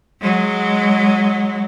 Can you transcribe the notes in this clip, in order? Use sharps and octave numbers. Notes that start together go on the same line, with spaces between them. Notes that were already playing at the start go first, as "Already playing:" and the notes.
F#3 G#3